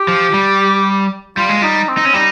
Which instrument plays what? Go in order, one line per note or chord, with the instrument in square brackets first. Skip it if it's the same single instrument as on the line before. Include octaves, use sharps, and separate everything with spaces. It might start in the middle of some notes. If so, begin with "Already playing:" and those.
Already playing: [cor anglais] G4
[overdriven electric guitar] F3
G3
[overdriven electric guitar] G3 [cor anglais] F4
[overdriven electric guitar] G#3
[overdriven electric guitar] G3 [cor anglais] D#4
[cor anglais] C4
[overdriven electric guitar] D#4
C#4
[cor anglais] G3 [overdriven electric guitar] D#4